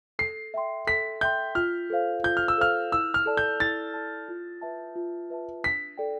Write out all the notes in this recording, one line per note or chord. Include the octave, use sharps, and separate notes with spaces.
A4 C7
E5 G5 C6
A4 B6
E5 G5 C6 G6
F4 F6
A4 C5 F5
F4 G6
F6
E6
A4 C5 F5 F6
E4 E6
F6
A4 D5 A5
G6
E4 A6
A4 D5 A5
F4
B4 E5 A5
F4
B4 E5 A5
D4 B6
A4 D5 G5